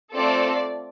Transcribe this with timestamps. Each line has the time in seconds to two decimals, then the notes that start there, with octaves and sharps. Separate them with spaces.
0.14 A3 C4 F4 A4 D5